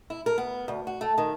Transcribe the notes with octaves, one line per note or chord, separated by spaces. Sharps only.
E4
A#4
B3
D2
F#4
A3
D#3